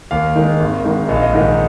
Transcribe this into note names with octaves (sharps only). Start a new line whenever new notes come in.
D#2 F5
D#3 G#3
G#1
G#2 D#3 G#3
A#1 D#5
F5
D#5
G#2 D#3 G#3